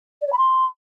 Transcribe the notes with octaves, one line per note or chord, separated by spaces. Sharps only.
D5
C#5
B5
C6